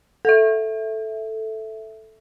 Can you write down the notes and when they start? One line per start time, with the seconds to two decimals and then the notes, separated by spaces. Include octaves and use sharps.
0.25 A4 E5